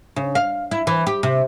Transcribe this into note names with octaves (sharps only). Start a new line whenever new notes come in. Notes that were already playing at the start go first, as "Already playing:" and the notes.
C#3
F5
E4
E3
G4
C3